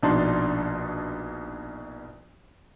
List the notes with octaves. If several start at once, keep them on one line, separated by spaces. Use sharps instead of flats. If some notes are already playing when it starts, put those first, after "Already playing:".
A#1 B2 D4 D#4 A5 C6